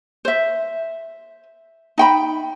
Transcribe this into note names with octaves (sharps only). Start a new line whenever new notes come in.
C5 E5
D#4 G5 B5